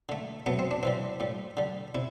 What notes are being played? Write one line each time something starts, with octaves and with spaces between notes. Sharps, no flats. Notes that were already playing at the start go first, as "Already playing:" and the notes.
D3 A3
C3 F#3 A3 B3
C4
D4
C3 E3 G3 C4
A2 G3
D3 G3
C3 E4